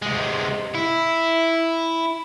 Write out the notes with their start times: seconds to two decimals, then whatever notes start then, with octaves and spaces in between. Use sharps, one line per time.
0.02 C3 G#3
0.75 E4